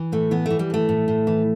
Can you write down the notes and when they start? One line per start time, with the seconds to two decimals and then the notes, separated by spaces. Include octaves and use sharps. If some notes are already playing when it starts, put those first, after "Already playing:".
Already playing: E3
0.12 A2 A3
0.31 E3 B3
0.46 E3 A3
0.59 G3
0.70 A2 A3
0.89 A2
1.08 A2
1.27 E3